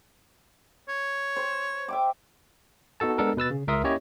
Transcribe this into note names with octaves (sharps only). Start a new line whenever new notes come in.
C#5
C5
E5 G5 D6
B3 D#4 F#4 A4 A5
G#3 B3 D4 A4 A#4
B2 B4 E6 A6
C#3
C#2 A#4 E5 C6 D#6
A#3 C#4 E4 G4 C#5 D#5